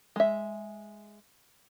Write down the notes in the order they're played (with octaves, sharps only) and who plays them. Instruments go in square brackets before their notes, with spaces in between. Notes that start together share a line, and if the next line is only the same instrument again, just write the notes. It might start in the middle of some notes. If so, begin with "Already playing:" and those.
[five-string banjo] G#3 E5